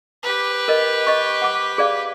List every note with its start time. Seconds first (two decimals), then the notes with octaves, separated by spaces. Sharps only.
0.23 G4 B4
0.68 A#4 D#5
1.07 D#5 C#6
1.42 F#5 D6
1.78 G#4 D5 F5